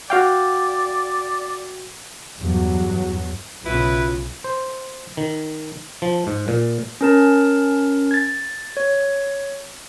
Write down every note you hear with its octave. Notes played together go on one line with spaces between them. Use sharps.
F#4 D5 F5 G5
E2 G2 F#3
B1 C#3 E4 F4 B4
C5
D#3
F3
G#2
A#2
C#4 A#4 A5
G#6 A6
C#5